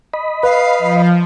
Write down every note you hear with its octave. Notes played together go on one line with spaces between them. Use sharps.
D#5 B5
B4 F5
F3